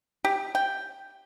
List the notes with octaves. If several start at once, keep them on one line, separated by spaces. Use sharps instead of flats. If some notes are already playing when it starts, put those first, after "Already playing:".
G4
G5